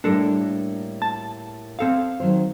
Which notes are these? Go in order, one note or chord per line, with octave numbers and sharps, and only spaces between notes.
A2 G3 A#3 D4 A4 A#4
A5
C4 A4 F5
D#3 F#3 C5